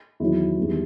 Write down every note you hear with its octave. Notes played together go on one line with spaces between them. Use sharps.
E2 D#3 F#3 E4
E2 D#3 G3 B3 E4